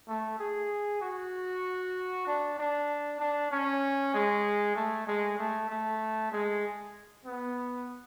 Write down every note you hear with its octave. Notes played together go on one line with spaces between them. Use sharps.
A3
G#4
F#4
D4
D4
D4
C#4
G#3
A3
G#3
A3
A3
G#3
B3